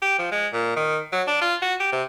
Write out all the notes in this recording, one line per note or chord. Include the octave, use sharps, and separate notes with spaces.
G4
F3
G#3
A#2
D#3
F#3
D4
F4
F#4
G4
C3